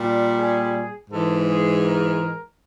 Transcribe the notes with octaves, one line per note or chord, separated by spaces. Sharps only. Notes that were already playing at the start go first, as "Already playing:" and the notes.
Already playing: A#2 G3
G#4
G#2 E3 G#3 A4
G#4
A#4